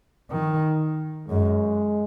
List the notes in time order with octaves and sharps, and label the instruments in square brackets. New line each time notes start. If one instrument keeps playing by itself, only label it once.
[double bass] D#3
[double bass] F#2 [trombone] G#3